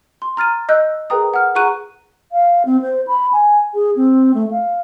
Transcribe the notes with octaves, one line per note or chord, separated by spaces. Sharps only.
C6
A#5 F6 A6 D#7
D#5 E6 F#6 G6
G#4 A#4 B4 G5 A#5 D#6
F#5 F6
G#4 F#5 A#5 C#6 F#6 D#7
F5
C4
C5
B5
G#5
G#4
C4
A3
F5